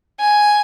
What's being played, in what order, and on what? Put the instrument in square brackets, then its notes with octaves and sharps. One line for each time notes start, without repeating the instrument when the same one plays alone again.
[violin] G#5